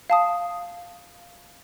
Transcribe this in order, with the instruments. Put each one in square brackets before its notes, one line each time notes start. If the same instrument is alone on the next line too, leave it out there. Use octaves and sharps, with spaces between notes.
[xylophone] F5 A5 D#6